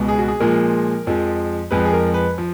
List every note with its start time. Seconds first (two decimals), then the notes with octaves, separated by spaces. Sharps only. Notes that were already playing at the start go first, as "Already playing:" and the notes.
Already playing: C#2 B2 G#3
0.08 G#4
0.18 F#4
0.28 G#4
0.40 A#2 F3 G#3 A#4
1.07 F2 F3 G#3
1.71 F2 F3 G#3 B4
1.85 G#4
1.93 A#4
2.14 B4
2.38 F3